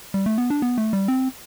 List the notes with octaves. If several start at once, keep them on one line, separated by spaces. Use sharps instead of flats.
G3
A3
B3
D4
B3
A3
G3
C4